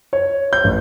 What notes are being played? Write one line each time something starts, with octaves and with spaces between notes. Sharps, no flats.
C#5
G6
A1